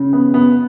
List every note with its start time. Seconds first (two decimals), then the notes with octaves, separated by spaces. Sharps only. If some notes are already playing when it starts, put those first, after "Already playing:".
Already playing: C#3
0.13 B3
0.34 B3